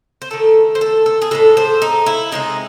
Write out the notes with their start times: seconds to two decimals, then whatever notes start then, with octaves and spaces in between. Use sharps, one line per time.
0.22 C5
0.31 D#3 A3 A4
0.75 C5
0.81 A4
1.06 A4
1.22 G#4
1.31 A2 E3 G#3 A4
1.57 C5
1.82 D#4
2.07 E4
2.32 C3 D#3 G#3 D#4